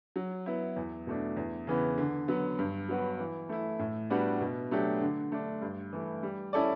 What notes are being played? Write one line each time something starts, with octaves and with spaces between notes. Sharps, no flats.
F#3
B3 E4
E2
B2 A3 D4
E2
C#3 E3 B3
D3
F#3 B3
G2
F#3 B3 F#4 B4
E3
A3 E4
A2
G3 B3 D4 F#4
B2
F#3 A3 D4 G4
D3
A3 D4
G2
E3 A3
G3
C#4 E4 A4 D5